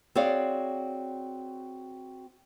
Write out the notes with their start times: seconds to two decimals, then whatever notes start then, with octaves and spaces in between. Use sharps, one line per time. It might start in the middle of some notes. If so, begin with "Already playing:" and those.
0.15 C4 F#4 G#4 C#5 D5 F5